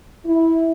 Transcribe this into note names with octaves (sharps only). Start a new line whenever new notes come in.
E4